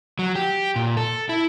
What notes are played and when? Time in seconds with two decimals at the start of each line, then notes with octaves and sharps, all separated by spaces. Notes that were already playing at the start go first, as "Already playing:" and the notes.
0.19 F#3
0.35 G4
0.76 A#2
0.97 A4
1.29 E4